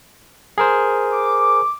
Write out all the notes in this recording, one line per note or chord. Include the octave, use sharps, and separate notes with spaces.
G#4 A#4 C5
D6